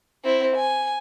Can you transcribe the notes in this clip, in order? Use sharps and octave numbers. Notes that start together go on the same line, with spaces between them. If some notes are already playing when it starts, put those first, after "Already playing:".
C4 E4
G#5